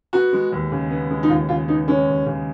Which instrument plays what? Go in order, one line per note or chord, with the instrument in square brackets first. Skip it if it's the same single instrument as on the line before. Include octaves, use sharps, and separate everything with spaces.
[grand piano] B3 [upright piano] F#4
[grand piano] G#3
D#2
C#3
B3
G#3
[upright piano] D#4
[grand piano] D#2 [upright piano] F4
[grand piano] C#3 [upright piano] F4
[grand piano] B3 [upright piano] D#4
[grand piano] G#3 [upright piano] C#4
[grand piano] D#2
C#3